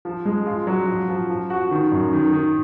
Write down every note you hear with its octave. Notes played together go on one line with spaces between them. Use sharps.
F3
G#3
F4
F#3
F3
F3
F3
F#4
D#3
F#2
D#3
D#3